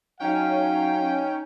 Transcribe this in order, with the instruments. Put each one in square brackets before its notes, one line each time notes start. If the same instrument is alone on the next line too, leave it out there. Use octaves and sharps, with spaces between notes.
[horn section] F#3 F5 [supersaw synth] C#4 [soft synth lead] D#4 [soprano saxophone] G5